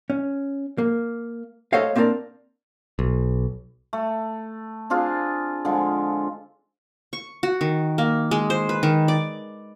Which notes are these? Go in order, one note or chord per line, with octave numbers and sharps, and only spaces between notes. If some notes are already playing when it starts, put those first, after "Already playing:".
C#4
A#3
A3 A4 C5 C#5 D#5 F5
A#3 C4 D4 G#4 A#4 D5
B1
A3
C4 D4 F4 G#4
D3 F3 G#3
C#6
F#4
D#3
A#3
G#3
C5
B4
D#3
D5